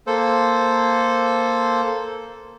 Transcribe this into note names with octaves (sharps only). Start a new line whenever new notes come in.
A#3 A4 C5